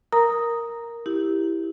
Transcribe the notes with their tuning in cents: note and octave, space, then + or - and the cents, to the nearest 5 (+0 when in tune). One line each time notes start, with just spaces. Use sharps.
A#4 +0 A#5 +0 D#6 +0
E4 +0 G4 +5